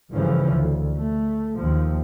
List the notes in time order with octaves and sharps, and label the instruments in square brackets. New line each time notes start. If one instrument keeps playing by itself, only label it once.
[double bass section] F1 G2 C#3 E3 F3 C#4
D2
A3
D#2 F3